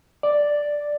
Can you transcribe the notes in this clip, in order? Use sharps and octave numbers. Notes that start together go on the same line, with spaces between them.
D5